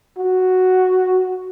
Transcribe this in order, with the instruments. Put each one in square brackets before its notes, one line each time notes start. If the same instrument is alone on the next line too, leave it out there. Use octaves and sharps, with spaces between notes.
[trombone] F#4